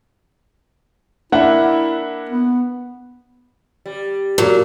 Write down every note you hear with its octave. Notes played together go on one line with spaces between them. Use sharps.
A#3 D4 E4 E5 F#5
B3
G3
A#2 F#3